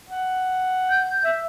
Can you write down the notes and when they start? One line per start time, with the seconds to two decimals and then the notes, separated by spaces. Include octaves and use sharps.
0.09 F#5
0.89 G6
1.24 E5